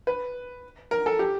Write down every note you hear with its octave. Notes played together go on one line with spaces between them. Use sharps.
B4
A#4
A4
G4